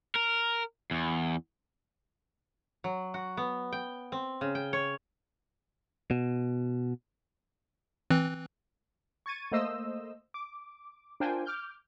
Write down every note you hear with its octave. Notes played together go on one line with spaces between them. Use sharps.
A#4
E2
F#3
F#4
B3
G5
C4
C#3
G5
C#5
B2
E3 C4 F#6
C#6 G#6 A6 D#7
A3 A#3 C5 D#5 E6
D6
D4 F4 A#4 C5 G5 G#5
D6 F6 G6